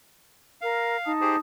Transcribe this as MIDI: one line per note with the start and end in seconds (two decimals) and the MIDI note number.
0.61 0.96 70
0.61 1.12 77
1.06 1.38 63
1.06 1.38 81
1.06 1.38 87
1.21 1.36 67
1.21 1.36 68
1.21 1.36 72